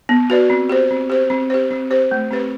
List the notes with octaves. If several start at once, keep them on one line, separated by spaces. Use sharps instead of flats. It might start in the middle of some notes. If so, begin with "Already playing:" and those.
B3
F#4 B4 D5
C4
G4 C5
C4
G4 C5
C4
G4 C5
C4
G4 C5
A3
C4 G4 B4